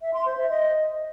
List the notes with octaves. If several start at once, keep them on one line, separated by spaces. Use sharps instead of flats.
E5
C6
C5
E5
D#5